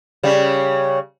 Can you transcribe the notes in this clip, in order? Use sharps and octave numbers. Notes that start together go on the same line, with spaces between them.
C#3 G3